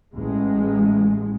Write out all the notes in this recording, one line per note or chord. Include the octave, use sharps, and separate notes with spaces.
A1 G#3